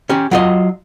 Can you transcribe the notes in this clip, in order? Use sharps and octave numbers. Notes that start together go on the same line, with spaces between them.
C#4 G4
F#3 F4 D#5